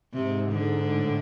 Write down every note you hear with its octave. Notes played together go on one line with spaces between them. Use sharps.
G#2 C3
D3
A2